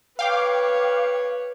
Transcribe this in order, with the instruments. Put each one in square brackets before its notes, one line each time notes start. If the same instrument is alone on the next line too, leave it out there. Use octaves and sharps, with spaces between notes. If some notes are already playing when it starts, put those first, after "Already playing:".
[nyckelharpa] B4 C#5 [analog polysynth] F5 G5 D6